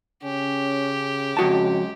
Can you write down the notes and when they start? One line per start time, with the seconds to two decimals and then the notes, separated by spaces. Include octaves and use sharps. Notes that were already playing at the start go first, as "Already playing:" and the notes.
0.24 C#3 C#4 G4
1.37 F2 C#3 G#3 F#4 A5